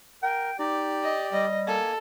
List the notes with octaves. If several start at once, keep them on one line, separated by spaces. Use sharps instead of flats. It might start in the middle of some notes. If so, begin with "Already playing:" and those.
A#4 G5
D#4 G4 D5
D#5
G3 D#5
A#3 A4 G#5